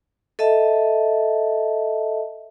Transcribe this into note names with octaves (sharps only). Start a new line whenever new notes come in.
A4 D#5 E5 A5